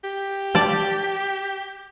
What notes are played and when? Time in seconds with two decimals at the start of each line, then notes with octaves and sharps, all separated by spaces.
0.04 G4
0.55 D5 A5